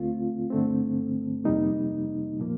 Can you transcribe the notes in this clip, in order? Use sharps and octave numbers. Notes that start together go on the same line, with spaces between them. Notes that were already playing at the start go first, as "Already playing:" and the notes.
Already playing: D2 D3 A3 C4 F4
G2 D3 A3 C4
F2 C3 G3 A#3 D#4
A#2 F3 A#3